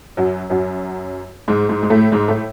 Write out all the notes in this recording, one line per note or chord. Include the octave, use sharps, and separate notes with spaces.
F#2 F#3
F#2 F#3
G#2 G#3
G#2 G#3
G#3
A2 A3
G#2 G#3
A2 A3